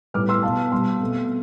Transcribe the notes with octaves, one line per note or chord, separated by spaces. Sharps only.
A2 G3 B3 D6 F6
C6 E6
B2 B3 F5 A5
B2 G3 B3 A5 C6
B2 A3 C4